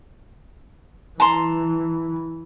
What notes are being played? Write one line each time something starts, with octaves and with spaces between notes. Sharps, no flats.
E3 A5 A#5 C6